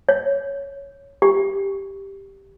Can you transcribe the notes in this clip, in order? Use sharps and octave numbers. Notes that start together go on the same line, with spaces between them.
C#5
G4